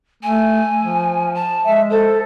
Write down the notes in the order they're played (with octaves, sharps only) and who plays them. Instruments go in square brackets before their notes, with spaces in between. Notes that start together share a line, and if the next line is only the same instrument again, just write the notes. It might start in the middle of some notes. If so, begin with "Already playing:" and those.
[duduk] A3 [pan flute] G#5
[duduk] F3
[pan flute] A5
[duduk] G#3 [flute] E5
[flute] A4 [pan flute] C5